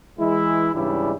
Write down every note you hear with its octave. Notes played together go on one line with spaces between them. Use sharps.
E3 G#3 E4
G#2 C#3 E3 G3 D4 E4